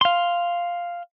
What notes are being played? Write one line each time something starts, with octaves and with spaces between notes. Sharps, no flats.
F5 C6